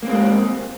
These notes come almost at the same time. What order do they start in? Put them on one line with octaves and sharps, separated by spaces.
A#3 C4 G#3